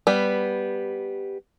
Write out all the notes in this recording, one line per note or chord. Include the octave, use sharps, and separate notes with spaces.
G3 B3